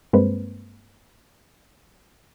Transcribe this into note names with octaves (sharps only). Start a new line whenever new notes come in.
G2 G#3 A#3 C4 B4 C5